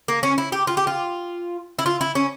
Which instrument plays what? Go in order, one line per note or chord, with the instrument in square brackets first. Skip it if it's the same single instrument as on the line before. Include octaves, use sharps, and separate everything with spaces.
[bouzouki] A#3
C#4
E4
G4
F4
G4
F4
E4
F4
E4
C#4